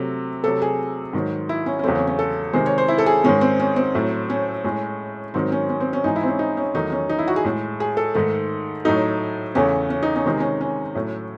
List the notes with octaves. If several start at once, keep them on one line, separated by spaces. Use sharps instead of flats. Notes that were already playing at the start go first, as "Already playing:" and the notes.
Already playing: C3 F#3 A3
C3 F#3 A3 A4
G#4
G#2 D#3 F#3
E4
C#4
C#4
E2 C#3 F#3 A3 C4
C#4
C#4
A4
C3 D#3 G#3 C5
C#5
C5
E4
A4
G#4
G#2 D#3 G#3 C#4
C4
C#4
C4
A2 F#3 A3
C#4
A2 G#3
G#2 D#3 F#3 C4
C#4
C#4
C4
C#4
G#2 E3 G#3 D#4
E4
C4
C#4
D#4
C#4
E2 D#3 F#3 A3 D#4
C#4
D#4
E4
F#4
G#4
A2 G#3
G#4
A4
G#2 D#3 A3
A2 F#3 A3 D#4
E2 C#3 E3 A3 C#4
C#4
D#4
C#4
C3 D#3 G#3 D#4
C#4
C#4
A2 F#3 A3